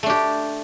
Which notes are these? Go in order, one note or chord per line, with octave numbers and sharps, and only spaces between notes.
A3 D4 G4